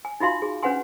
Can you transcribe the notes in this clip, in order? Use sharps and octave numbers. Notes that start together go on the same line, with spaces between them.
G#5
D#4 F4 F#4 E5 F5 C6
G#4
C#4 D4 B4 F#5 G#5 C6